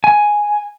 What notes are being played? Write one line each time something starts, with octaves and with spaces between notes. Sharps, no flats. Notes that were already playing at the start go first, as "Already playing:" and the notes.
G#5